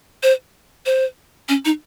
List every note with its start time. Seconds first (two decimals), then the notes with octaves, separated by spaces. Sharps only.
0.23 C5
0.86 C5
1.49 C#4
1.65 D#4